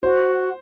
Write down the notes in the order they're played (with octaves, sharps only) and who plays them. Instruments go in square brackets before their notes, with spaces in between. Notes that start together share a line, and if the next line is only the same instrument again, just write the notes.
[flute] F#4 [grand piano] C5